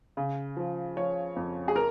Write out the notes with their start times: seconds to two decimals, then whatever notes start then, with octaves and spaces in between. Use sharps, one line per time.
0.17 C#3
0.57 F3
0.96 F3 C#5
1.36 F2
1.68 G#4
1.76 A#4